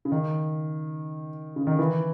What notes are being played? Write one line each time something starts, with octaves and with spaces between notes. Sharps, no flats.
C#3
D#3
C#3
D#3
E3